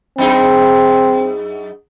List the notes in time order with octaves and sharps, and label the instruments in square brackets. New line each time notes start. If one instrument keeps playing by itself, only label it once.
[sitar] F#2 D#4 G#4 [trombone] C4